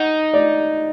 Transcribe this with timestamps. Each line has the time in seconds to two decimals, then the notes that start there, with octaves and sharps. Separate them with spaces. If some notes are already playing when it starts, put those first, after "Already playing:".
Already playing: D#4 F#5
0.34 D5